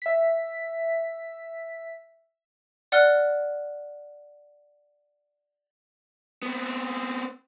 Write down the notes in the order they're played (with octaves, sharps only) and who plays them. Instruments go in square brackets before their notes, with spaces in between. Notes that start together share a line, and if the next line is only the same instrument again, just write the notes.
[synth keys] E5 B6
[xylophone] D5 F#5 F6 F#6 G7
[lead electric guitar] B3 C4